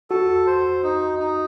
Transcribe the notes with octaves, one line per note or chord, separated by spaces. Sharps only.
F#4 A4
C5
D#4
D#4